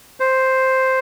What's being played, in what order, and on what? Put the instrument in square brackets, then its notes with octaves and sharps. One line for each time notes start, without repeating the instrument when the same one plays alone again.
[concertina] C5